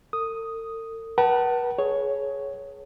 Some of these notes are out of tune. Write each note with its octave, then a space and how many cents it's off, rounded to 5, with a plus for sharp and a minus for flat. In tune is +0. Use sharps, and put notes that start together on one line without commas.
A4 +45 D#6 +0
B4 -40 F#5 +35 A5 +15
G#4 +20 C#5 +0